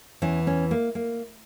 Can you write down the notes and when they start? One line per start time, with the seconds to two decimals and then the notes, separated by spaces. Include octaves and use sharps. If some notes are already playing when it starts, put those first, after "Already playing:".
0.22 E2 E3 C#4
0.47 C#4
0.71 A#3
0.95 A#3